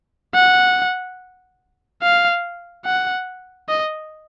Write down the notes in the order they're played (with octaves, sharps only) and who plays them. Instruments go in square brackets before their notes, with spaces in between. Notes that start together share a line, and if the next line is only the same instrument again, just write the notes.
[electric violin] F#5
F5
F#5
D#5